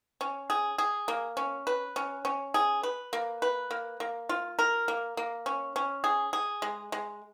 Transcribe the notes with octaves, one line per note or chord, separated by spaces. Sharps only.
C#4
G#4
G#4
A#3
C#4
B4
C#4
C#4
G#4
B4
A#3
B4
A#3
A#3
F4
A#4
A#3
A#3
C#4
C#4
G#4
G#4
G#3
G#3